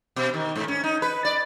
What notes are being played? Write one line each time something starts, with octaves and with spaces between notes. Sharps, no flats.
B2
D#3
G#2
C#4
D#4
B4
D5